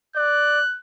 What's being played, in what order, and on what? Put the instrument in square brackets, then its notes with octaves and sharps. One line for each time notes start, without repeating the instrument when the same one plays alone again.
[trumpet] D5 [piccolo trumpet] F#6